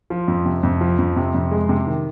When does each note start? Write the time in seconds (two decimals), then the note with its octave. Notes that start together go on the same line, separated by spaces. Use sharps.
0.10 F3
0.28 F2
0.45 C3
0.63 F2
0.81 F3
0.99 F2
1.16 C3
1.34 F2
1.51 G#3
1.69 C3
1.87 D#3